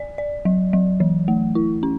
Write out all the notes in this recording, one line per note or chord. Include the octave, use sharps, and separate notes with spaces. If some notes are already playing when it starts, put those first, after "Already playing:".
Already playing: D5
D5
F#3
F#3
E3
A3
E4
C#4